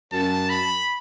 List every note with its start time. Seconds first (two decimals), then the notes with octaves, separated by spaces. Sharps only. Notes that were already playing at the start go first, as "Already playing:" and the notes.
0.13 F#2 A5
0.50 B5